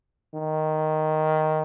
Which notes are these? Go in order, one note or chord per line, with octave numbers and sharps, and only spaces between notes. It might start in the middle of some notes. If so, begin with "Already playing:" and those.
D#3